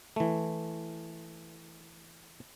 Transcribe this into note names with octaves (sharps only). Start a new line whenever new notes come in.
E3 A3